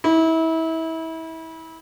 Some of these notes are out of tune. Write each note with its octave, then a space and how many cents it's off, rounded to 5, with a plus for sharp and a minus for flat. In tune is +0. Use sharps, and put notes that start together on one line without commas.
E4 -30